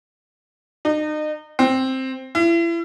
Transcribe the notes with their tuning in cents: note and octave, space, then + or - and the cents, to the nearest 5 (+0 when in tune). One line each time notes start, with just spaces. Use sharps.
D#4 -35
C4 +5
E4 +35